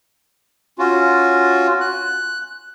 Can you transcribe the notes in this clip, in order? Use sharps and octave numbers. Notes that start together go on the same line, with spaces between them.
C#4 F4 F#4
F#6